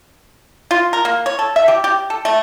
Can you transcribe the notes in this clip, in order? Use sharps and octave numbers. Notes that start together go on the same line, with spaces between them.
F4
A#4
A#3
C#5
A4
E5
G4
G4
A4
A3